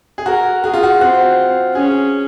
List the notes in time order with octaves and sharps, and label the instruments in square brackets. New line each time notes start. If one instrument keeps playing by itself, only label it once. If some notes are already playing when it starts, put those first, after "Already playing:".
[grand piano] G#4
[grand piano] F#4 [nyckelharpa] A#4
[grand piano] F#4 [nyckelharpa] G#4
[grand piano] F4
F#4
[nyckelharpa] C4 [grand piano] F#4
[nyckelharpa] C#4 [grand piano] G#4